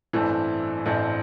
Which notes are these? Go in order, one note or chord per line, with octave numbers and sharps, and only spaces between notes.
A1 G2 E3 A3 C4
A1 G2 E3 A3 C4